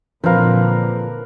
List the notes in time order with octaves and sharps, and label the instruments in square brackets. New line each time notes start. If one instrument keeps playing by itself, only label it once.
[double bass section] A#2 D3 [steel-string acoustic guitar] F3 [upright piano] C4 F5 [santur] A#4 B4